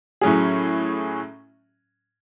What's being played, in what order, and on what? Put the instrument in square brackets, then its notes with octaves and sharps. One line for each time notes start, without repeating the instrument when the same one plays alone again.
[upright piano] A2 F#3 C#4 G#4